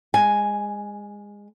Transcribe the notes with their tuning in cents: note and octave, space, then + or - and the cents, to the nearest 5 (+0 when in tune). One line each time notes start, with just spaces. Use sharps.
G#3 -25 G#5 +0